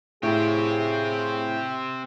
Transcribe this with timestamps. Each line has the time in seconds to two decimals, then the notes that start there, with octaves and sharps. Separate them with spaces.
0.23 A2 C4 G4 G#4 C#5 F5